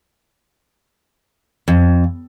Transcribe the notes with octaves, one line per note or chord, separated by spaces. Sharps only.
F2